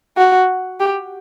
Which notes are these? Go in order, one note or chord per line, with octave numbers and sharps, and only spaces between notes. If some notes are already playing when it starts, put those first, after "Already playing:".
F#4
G4